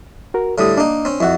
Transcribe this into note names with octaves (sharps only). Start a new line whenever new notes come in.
F#4 A#4
A2 D3 G3 A4 D#6
A#3 D4 D#4
C4 C#4
F2 E4 F#4 E5 F#5